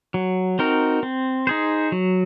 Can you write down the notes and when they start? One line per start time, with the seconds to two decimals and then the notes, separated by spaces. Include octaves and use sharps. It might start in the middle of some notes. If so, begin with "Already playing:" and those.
0.14 F#3
0.59 C4 D#4 F#4 A#4
1.03 C4
1.47 D#4 G#4 C5
1.92 F#3